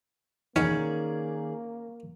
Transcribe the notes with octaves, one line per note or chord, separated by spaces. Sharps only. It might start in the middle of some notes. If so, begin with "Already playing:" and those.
D#3 E3 A#3 B3 C#4 D#4 G#4 D5